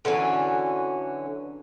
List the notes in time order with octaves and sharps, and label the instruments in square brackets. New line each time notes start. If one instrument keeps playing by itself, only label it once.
[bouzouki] D3 E3 F#3 C#4